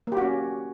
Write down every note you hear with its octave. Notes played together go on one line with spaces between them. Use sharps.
A#3 C#4 F#4 G4